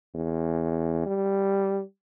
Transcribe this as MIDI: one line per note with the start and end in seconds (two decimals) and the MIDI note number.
0.15 1.01 40
1.06 1.81 55